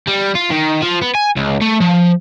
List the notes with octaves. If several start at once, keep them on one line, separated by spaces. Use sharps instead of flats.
G3
F4
D#3
F3
B3
G#5
C#2
A3
F3